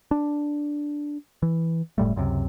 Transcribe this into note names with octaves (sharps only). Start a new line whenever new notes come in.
D4
E3
F#1 A2 G3 A3
C#2 F#2 C3